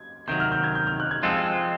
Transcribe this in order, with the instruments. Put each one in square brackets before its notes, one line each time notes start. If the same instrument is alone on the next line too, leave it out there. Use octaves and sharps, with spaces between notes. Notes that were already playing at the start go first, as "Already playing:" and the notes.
Already playing: [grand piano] G#6
[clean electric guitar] C3 D#3 F#3 [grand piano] G6
[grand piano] F6
G6
G#6
G6
F6
F#6
G#6
[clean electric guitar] F3 G#3 C4 F4 A4 [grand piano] A6